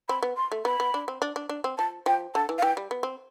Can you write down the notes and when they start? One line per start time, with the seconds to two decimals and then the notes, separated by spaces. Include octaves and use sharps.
0.09 C4 B5
0.23 B3
0.37 C6
0.52 A3
0.65 B3 B5
0.80 B3
0.94 D4
1.08 C4
1.22 D4
1.36 D4
1.49 D4
1.64 C4
1.78 F3 A5
2.06 F3 G5
2.35 D3 A5
2.49 E3
2.58 F5
2.62 E3 G5
2.77 G3
2.91 B3
3.03 C4